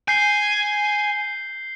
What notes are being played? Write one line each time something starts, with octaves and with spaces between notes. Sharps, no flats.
G#5 G6 C7 G7